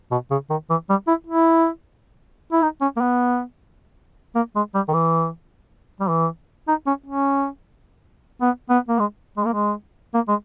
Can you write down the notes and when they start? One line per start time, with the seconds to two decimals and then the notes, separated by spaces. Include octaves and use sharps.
0.11 B2
0.31 C#3
0.50 D#3
0.70 E3
0.89 G3
1.08 E4
1.27 E4
2.52 E4
2.62 D#4
2.81 C#4
2.97 A#3
3.01 B3
4.35 A#3
4.56 G#3
4.75 G3
4.88 D#3
4.93 E3
6.00 G3
6.09 E3
6.68 D#4
6.87 C#4
7.06 C#4
8.41 B3
8.70 B3
8.88 A#3
8.99 G#3
9.37 G#3
9.46 A#3
9.54 G#3
10.14 A#3
10.28 G#3